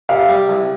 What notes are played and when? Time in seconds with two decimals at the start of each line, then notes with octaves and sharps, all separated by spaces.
0.09 C3 F5
0.29 G3
0.49 C2